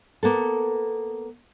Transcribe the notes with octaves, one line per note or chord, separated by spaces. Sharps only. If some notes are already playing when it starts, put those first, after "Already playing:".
A#3 B3 A4